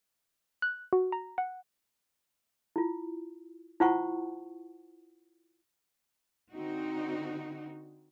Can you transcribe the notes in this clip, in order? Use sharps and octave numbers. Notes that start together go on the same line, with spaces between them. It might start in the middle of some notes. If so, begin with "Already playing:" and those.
F#6
F#4
A#5
F#5
E4 F4
E4 F4 C5 F#5 A5 C#6
D3 C4 D#4 F#4